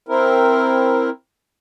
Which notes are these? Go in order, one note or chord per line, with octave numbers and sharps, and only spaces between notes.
C4 E4 A#4